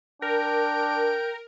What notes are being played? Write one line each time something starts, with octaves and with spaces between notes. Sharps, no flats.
D4 A#4 G5